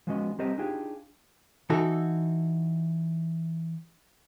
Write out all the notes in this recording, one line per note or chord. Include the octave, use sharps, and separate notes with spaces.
F3 G#3 B3 C#4 F#4 D#5
G3 C4 G4 A#4 C5 D#5
D4 D#4 F4 G4 G#4
E3 D#4 F#4 A4